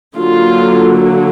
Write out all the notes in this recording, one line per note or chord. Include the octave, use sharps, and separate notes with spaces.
D3 F#3 A#3 F4